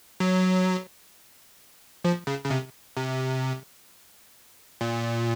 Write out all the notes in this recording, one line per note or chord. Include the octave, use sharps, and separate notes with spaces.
F#3
F3
C#3
C#3
C3
C3
A#2